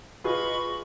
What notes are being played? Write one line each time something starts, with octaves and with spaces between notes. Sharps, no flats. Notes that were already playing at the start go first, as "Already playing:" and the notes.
F4 G#4 B4 D#5 B5 C#6